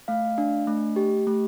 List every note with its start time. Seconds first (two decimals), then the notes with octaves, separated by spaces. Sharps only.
0.08 A3 F5
0.38 D4
0.67 A3
0.96 G4
1.27 A3